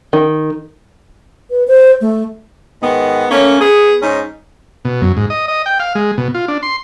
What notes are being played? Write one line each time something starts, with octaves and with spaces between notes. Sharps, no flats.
D#3
B4
C5
A3
G#2 D#3 B3
A3 A#3 C#4
B3 G#4
G#2 C#4 D#4
B2
F#2
G#2
D#5
D#5
G5
F5
G#3
B2
F4
D4
C6